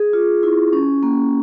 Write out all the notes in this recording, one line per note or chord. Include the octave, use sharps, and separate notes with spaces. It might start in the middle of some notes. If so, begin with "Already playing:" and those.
Already playing: G#4
F4
E4
C#4
A#3